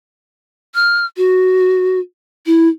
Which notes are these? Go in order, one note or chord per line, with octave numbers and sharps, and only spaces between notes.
F6
F#4
E4